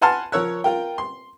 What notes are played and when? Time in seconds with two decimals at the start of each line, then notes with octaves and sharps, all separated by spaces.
0.01 B4 F#5 G#5 A5 C6 F6
0.32 F3 A#4 C#5 E6 F#6
0.64 F4 A#4 G5
0.98 C6